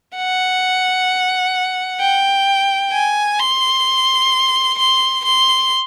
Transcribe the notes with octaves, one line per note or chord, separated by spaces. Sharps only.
F#5
G5
G#5
C6
C6
C6